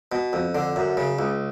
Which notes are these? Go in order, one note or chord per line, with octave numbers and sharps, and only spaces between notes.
B2
F2
D3
F#2
C#3
C#2